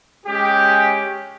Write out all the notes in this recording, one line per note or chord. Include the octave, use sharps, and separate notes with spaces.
G#3 C#4 G4